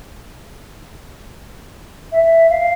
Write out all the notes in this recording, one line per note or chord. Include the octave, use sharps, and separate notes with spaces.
E5
F5